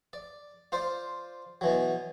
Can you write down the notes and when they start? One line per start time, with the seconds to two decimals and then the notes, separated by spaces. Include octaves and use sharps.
0.13 D5
0.72 F4 C5 D5
1.61 B2 E3 F#3